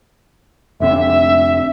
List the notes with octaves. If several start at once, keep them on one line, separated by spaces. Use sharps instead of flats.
F1 D3 C4 E5